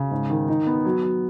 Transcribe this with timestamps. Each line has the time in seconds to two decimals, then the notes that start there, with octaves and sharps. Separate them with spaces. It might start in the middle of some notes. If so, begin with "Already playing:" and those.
Already playing: C#3
0.11 G#2
0.30 D#3
0.48 D#4
0.67 B3
0.85 F#3
1.04 F#3